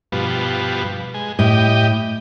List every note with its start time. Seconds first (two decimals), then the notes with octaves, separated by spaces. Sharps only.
0.12 G2 B2 F3
1.14 G#3
1.39 A2 G4 D#5